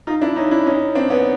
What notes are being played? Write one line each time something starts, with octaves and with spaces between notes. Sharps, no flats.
D#4 F4
D4 E4
C#4 D#4
D4 E4
C#4 D#4
C4 D4
B3 C#4